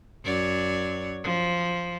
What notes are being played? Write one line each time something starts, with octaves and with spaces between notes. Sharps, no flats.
F#2 C#5 D5
F3